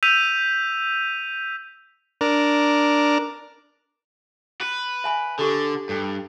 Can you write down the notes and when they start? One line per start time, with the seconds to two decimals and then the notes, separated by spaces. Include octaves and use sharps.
0.03 E6 G6 B6 D#7 F7
2.21 D4 A#4
4.61 B4
5.04 E5 G#5 B5
5.39 D3 G4 A4
5.89 G2 A4